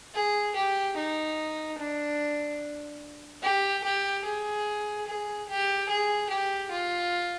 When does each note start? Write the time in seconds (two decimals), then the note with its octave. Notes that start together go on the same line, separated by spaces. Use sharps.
0.15 G#4
0.55 G4
0.96 D#4
1.78 D4
3.43 G4
3.84 G4
4.25 G#4
5.07 G#4
5.48 G4
5.89 G#4
6.30 G4
6.71 F4